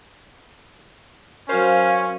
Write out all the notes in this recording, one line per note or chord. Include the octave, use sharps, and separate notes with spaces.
F#3 C#4 F#4 A#4 C5 F5